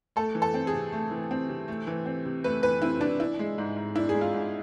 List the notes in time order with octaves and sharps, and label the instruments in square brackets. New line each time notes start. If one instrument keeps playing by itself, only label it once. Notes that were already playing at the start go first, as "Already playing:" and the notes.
[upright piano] A3 [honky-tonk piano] A4
[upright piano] E3
[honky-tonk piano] A4
[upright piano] C4
[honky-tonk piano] G#4
[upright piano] C3
A3
E3
C4
C3
A3
E3
C4
C3
[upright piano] A3 [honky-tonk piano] B4
[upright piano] E3 [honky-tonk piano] B4
[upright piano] C4 [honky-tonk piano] E4
[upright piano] C3 [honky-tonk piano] D4
[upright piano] D4 [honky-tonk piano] E4
[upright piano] G#3
G#2
G#2
[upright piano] D4 [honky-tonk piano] E4
[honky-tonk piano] G#4
[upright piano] G#3
[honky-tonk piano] F4
[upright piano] G#2